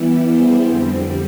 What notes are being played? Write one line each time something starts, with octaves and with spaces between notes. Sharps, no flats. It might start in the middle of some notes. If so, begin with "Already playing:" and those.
Already playing: E3 G3 B3 E4
G3 B3 E4 G#4 C5
F2 D3 G3 C4